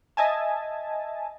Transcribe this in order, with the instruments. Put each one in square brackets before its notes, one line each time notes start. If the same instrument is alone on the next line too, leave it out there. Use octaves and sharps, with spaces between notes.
[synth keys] D#5 E5 G#5 A5